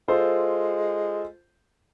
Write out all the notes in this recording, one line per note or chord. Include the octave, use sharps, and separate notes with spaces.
G#3 F4 A4 C5